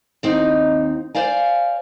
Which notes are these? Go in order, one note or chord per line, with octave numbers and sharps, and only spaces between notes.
D#2 C4 D#4
C5 D5 F5 G#5